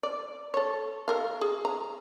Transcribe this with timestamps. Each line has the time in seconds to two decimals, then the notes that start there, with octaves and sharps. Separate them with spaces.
0.03 D5
0.54 A4 C#5
1.08 A4 A#4 F5
1.41 G#4
1.65 A#5